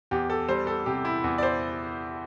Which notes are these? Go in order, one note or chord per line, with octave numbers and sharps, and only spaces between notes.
E2 G4
A4
G3 C5
A4
C3 G4
E4
E2
D5
C5